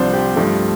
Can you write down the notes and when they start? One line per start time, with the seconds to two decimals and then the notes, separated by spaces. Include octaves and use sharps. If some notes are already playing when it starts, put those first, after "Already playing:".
Already playing: C2 C3 F3 D4 C5
0.13 G4
0.36 G2 F3 A3